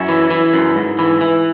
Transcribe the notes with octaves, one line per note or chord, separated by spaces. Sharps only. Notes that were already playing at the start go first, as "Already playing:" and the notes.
Already playing: F#2 C#4 E4
E3
E3
F#2
G#2
E3
E3